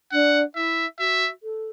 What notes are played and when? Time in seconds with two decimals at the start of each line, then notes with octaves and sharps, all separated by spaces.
0.12 D4 F#5
0.55 E4 E5
0.99 F#4 E5
1.43 A4